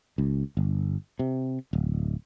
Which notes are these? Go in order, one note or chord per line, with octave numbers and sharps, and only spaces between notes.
C#2
G1
C3
D1